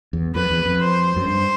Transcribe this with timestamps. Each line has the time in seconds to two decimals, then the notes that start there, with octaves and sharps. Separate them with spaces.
0.13 E2
0.35 F2 B4
0.51 E2
0.66 F2
0.81 C5
1.17 F#2
1.26 G2 C5